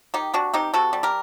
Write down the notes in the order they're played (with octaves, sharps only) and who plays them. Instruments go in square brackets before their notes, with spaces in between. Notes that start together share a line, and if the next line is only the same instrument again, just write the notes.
[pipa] D#3 D#4 G4
C3 D4 F#4
C3 D#4 G4
C3 F#4 A4
G3
G4 A#4